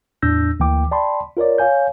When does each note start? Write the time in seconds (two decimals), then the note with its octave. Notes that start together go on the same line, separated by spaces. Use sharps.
0.22 E2 A2 D4 E6 G6 A#6
0.60 D2 E3 A#3 G5 D6
0.91 D5 G5 A5 B5 C6
1.37 F4 A#4 C#5 D5
1.58 C#5 F5 G#5 G6